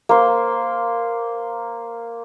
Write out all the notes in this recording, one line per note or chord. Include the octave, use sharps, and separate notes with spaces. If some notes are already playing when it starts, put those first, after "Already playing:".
A#3 C5